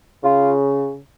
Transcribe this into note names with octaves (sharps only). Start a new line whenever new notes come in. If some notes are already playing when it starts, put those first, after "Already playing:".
C#3 F4